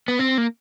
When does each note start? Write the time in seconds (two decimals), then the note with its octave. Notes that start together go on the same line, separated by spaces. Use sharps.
0.08 B3
0.19 C4
0.38 A#3